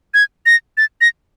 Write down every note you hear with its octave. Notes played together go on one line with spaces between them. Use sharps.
G#6
A#6
A6
A#6